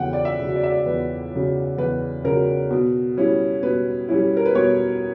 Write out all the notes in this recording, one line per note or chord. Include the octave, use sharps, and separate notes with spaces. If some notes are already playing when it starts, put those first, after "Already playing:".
Already playing: E2 C#3 F#3 F#5 G5
D5
E5
C#3 F#3
D5
E5
D5
E2 B4
C#3 F#3
E2 B4
C#3 F#3 A#4
B2
G3 C#4 E4
B2 B4
G3 C#4 E4
A#4
B4
B2 C#5